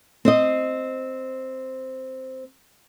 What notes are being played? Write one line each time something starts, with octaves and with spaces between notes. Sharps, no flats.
C4 C5 D#5